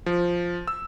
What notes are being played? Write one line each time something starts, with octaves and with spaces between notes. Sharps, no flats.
F3
E6